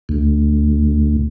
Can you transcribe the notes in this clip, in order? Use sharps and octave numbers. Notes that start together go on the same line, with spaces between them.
D2